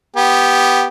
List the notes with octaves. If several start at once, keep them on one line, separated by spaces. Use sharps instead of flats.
B3 G4